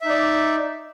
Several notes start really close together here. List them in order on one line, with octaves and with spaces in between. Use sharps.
E5 D#4 D5